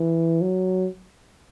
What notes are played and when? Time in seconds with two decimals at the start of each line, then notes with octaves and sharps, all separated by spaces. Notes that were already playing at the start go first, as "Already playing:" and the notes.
Already playing: E3
0.42 F#3